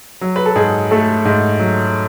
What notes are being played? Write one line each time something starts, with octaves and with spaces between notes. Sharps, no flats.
F#3
B4
A4
G#2 G#4
A3 A4
G#2
F#3